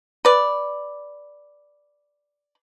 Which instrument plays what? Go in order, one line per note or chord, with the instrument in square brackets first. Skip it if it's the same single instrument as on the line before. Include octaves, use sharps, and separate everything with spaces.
[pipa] B4 D5